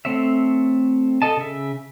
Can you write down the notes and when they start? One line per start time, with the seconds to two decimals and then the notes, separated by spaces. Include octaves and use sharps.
0.05 A3 C4 C#5 E5
1.22 A4 D#5 A5
1.37 C#3 E5